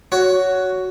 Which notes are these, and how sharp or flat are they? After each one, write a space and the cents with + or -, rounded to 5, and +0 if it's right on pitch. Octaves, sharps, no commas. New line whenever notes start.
F#4 +0 C#5 +15